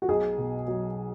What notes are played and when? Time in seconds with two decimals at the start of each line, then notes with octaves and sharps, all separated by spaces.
0.02 F#4
0.08 B1 G#4
0.38 B2
0.68 F#3